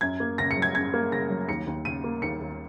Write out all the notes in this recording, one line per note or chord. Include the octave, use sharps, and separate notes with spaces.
F#2 G#6
A#3
C#3 A#6
C#7
F#3
G#6
F#2 G#6
A#3
C#3 A#6
F#3
D#2 C#7
D#2
C#3 D#7
A#3
D#2 C#7
D#2